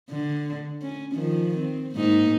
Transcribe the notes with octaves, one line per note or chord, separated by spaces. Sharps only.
D3
C#4
D#3 F3
C4
G#2 A#3 D#4